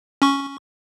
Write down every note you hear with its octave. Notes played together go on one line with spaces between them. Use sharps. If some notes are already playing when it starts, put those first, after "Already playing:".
C#4 C#6